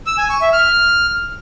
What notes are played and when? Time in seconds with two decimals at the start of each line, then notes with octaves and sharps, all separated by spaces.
0.06 E6
0.18 G#5
0.30 C#6
0.41 E5
0.53 F6